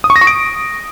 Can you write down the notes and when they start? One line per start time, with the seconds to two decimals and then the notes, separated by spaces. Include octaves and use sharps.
0.04 D#6
0.10 C#6
0.16 A#6
0.21 C#6
0.27 D7